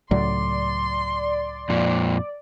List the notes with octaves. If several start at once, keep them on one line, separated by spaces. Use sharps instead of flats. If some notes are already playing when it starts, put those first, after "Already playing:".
C#2 A2 F#3 D5 C6
F2 A#2